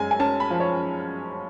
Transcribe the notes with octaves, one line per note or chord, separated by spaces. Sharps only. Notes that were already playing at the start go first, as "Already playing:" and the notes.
Already playing: F#2 G#3 G#5
G#5
C#4 A5
B5
F3
C#5